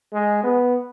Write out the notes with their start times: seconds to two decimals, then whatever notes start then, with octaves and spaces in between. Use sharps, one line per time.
0.13 G#3
0.43 B3